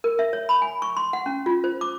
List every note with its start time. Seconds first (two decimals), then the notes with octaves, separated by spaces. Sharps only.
0.04 A#4
0.19 E5
0.33 C#5
0.49 B5
0.62 G#5
0.82 C#6
0.97 C6
1.13 F#5
1.26 C#4
1.46 F4
1.64 C5
1.81 D6